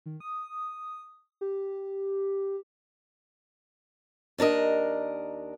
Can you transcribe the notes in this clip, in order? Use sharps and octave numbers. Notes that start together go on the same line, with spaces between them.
D#3
D#6
G4
D#2 D4 A#4 D#5